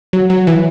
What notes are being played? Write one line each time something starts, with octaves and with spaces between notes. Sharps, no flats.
F#3
F#3
E3